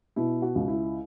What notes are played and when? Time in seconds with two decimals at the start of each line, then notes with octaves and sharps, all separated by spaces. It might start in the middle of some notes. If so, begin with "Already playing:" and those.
0.16 B2 E4
0.42 F#4
0.55 C#2
0.68 E4